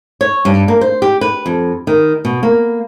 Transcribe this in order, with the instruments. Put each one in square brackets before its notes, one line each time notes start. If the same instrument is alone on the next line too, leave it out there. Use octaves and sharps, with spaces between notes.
[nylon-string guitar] C#5
G2
A#3
C5
G4
B4
F2
D#3
B2
A#3